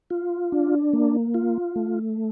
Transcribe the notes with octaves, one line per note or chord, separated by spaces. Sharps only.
F4
D4
A#3
F4
A3